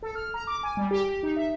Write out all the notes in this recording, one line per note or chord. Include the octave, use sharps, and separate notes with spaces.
A4
F6
A#5
D6
G#5
G3
G4
G4
D#4
E5